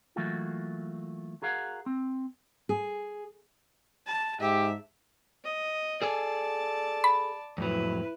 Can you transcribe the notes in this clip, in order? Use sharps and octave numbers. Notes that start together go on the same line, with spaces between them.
E3 F#3 A3 A#3 F4 F#4
F#4 G#4 A#4 F5 F#5
C4
G#4
A5
G#2 G4 E5
D#5
G#4 A4 D5 G#5 A5
B5
F2 A2 F#3 E4 B4